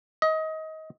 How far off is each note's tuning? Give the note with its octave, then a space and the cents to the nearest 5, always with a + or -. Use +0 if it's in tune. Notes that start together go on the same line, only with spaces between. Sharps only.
D#5 +25